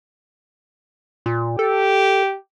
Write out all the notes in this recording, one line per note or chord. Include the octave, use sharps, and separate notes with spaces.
A#2
G4 A4